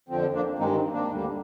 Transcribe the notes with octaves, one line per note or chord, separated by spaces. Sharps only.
F2 D3 F3 C4
A#3 D4
G2 D#3 G#3 C4 D#4
C4
A#3 D4
D2 D3 G3 A#3